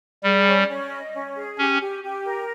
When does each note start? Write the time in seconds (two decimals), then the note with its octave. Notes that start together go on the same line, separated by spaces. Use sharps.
0.23 G3 G#4
0.46 C#4
0.69 C#4
0.91 D#5
1.13 C#4
1.36 G#4
1.58 C#4 G4
1.80 G4
2.03 G4
2.25 A#4